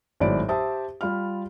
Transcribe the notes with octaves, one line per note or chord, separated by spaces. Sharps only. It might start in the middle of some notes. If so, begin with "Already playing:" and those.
G#1 A2 F#3 D5 B5 D7
G4 C5 E5 A5 D#6
G3 F4 B5 F6